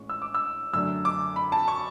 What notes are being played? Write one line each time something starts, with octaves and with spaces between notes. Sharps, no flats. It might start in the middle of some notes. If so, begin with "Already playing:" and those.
Already playing: A1 A2 G#3 C#4 C#6
E6
D6
E6
F#2 D3 A3 D4 E6
D6
B5
A5
C#6